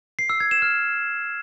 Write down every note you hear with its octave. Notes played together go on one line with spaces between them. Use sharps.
C7
E6
G#6
E7
F6